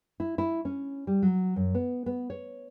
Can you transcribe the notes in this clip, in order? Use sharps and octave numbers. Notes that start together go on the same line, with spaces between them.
E4
E4
C#4
G3
F#3
F#2
B3
B3
C#5